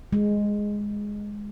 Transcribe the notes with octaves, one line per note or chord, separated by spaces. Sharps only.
G#3